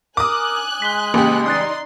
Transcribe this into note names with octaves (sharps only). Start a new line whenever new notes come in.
A#4 G#5 D6 D#6 F#6
G#3 B6 G7
A1 C#3 A#3 G4 D#6
D#4 D5 C6 D#6 F#6 A6